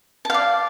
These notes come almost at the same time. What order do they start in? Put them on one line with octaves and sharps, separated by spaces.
A5 F5 D5